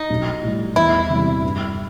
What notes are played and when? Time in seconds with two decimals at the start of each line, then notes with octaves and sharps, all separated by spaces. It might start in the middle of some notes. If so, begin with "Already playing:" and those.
Already playing: D#4
0.10 B1
0.43 A2 G3
0.76 E2 E4
1.10 C3 E3 G3
1.43 G2